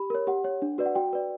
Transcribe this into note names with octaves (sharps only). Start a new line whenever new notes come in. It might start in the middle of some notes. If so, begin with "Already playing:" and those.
Already playing: G4 B5
A#4 C#5
G4 F#5
C#5
D4
F#4 B4 D5
F#5
F#4 G5
B4 D5